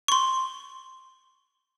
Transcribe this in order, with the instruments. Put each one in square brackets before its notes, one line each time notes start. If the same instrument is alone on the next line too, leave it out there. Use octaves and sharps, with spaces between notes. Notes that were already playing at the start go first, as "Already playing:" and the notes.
[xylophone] C6 C#6